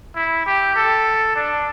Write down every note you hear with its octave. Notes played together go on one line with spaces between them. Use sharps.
E4
G4
A4
D4